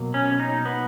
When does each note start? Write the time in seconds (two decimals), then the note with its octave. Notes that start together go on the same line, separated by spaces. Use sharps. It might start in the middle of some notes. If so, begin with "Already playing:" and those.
Already playing: B2 F#3 A#3
0.14 C#4
0.40 D#4
0.65 B3